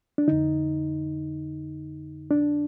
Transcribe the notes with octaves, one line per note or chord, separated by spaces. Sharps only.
D4
F2 D3 D#4
D4